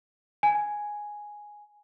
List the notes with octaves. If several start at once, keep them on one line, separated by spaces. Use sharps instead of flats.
G#5